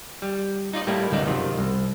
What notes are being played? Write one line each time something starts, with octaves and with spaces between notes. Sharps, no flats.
G3
D#4 F4 D5 D#5
A2 G3 A#3 E4
G1 C#2 F#2 A3 D#4 D5
F#2 C3 D#3 F4
C2